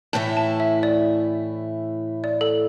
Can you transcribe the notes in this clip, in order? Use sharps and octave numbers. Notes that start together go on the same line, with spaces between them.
A2 E3 A3 E4 A5
A5
E5
D5
D5
A4